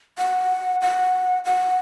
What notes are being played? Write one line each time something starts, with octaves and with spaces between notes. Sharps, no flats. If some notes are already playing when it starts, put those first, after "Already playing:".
F#5
F#5
F#5